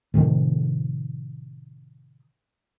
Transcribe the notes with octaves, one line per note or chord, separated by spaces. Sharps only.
A2 C3 D#3 F3